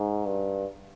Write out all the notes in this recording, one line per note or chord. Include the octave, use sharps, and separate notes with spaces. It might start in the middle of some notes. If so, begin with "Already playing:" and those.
Already playing: G#2
G2